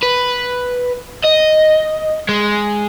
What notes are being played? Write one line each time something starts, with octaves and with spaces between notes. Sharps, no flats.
B4
D#5
G#3